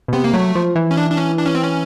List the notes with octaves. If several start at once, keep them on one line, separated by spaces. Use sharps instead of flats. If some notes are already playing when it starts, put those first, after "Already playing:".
B2
C3 B3
A#3
F#3 A3
F3
E3
C#4
D4
D4
C#4
D4
C#4
C4
C#4